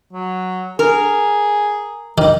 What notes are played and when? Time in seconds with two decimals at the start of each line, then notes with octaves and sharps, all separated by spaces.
0.13 F#3
0.79 G#4 A#4
2.18 D#3 G3